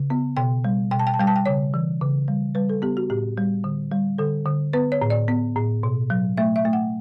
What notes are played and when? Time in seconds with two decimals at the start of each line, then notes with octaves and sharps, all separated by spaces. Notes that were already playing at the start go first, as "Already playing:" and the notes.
Already playing: C#3
0.10 B3
0.37 B2 G5
0.64 G3
0.91 B2 G5
0.99 A5
1.07 G5
1.14 A5
1.19 G3 G5
1.27 A5
1.36 G5
1.46 C#3 C#5
1.74 E3
2.01 C#3
2.28 G3
2.55 G3 B4
2.69 A4
2.82 B3 G4
2.97 F#4
3.10 A2 G4
3.38 G3
3.64 D3
3.92 G3
4.18 D3 A4
4.46 D3
4.73 B3 B4
4.92 C#5
5.02 A2
5.10 D5
5.28 B3
5.56 A2
5.83 B2
6.10 F#3
6.37 A3 E5
6.56 E5
6.65 A3
6.73 F#5